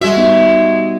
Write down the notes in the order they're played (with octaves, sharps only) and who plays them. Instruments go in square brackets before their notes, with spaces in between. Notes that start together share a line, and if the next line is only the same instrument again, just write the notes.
[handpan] G3 F#4 [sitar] G#3 E5
[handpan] B3 D#4